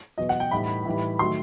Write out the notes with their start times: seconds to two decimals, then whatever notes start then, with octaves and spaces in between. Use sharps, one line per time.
0.18 E2 B2 F#3 D#5
0.29 F#5
0.40 G5
0.51 A2 E3 G3 D#4 B5
0.85 A2 E3 G3 D#4
1.19 D#3 F#3 A3 C6